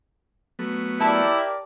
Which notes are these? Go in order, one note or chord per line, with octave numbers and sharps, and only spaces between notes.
F#3 A3 B3
E4 G4 A#4 D5 A5